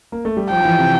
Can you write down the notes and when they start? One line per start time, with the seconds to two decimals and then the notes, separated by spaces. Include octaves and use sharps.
0.12 A#3
0.25 A3
0.37 G3
0.50 F3 G5
0.60 F3
0.65 E3
0.79 C3